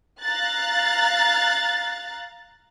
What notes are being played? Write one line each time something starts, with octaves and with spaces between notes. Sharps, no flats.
F5 A#5 F#6 A6